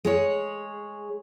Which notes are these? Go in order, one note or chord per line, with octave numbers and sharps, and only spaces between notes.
G#3 G#4 C#5